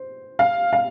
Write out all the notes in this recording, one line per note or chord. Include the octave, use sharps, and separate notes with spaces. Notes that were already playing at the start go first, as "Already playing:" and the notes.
Already playing: C5
F5
F5